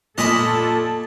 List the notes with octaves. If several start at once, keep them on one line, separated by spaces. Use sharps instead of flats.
A#2 A4 D#5 A5 B5